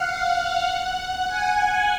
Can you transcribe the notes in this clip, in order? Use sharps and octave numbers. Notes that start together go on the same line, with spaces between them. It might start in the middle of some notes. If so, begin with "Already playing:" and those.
Already playing: F5 F#5
G#5